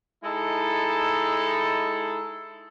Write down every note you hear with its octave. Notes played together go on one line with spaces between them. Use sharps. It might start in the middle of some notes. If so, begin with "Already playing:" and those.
G#3 D#4 E4 A4